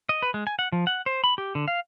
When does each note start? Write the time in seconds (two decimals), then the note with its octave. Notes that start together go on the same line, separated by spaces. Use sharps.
0.09 D#5
0.22 B4
0.34 G#3
0.47 G#5
0.59 F#5
0.72 F3
0.87 F#5
1.06 C5
1.24 B5
1.38 G4
1.55 D3
1.68 F5